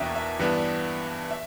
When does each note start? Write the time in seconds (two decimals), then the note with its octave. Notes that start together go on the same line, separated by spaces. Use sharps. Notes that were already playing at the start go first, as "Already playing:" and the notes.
Already playing: E2 B2 A#3 D4 E5 G5
0.16 E5
0.39 G2 E3 B3 D4
1.31 E5